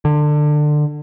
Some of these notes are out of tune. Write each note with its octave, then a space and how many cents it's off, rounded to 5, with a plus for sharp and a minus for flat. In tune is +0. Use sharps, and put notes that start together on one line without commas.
D3 +25